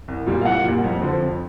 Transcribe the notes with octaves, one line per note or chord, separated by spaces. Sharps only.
C2
A#2 G3 A#3
F5
C2 F#5
A#2 G3 A#3
F2
D3 F3
F2